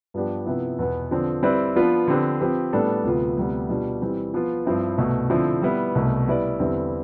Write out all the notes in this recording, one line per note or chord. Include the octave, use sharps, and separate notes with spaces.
G2 F3 B3 D4 G4
C3 F3 B3 E4
E2 B2 B3
D3 F3 C4
G3 C4 E4 B4 D5
F3 B3 D4 F4 B4
D3 F3 C4 G4 B4
F3 C4 G4 B4
A2 G3 B3 D4 A4
D2 C3 F3 B3 F4
D2 C3 G3 B3
B2 G3 D4 F4
E3 G3 C4
F3 B3 F4
G2 F3 C4 E4
C2 B2 A3
D3 F3 C4 E4
G3 B3 E4 B4
C2 B2 A3
G3 B3 E4 B4 D5
E2 D3 G3 C4 E4